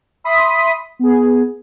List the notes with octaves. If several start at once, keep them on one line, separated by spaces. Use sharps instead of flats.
E5 B5 C6 D#6 B6
B3 G#4